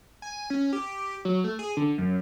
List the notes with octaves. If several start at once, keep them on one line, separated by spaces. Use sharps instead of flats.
G#5
C#4
G4
F#3
A3
G#4
D3
F#2